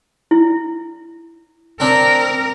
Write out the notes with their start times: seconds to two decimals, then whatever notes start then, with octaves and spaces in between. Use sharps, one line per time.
0.31 E4
1.80 C4 D4 A#4